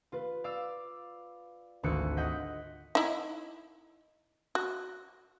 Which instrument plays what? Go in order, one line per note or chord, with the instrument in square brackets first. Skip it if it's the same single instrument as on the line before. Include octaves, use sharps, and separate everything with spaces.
[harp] F4 B4
D5 F5 D6 E6
G#1 D2 F4 E6 F#6 C#7
D#5 F#5 G6 B6
[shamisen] D#4 E4
F#4